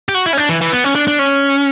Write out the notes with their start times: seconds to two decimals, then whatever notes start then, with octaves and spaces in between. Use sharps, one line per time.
0.09 G4
0.14 F#4
0.26 E4
0.33 C#4
0.38 D4
0.49 E3
0.61 E3
0.72 B3
0.84 C#4
0.95 D4
1.07 D4
1.19 C#4